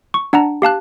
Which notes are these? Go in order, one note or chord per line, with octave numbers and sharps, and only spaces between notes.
C#6
D4 F#5 A5 A#5
G4 F5 A5 F#6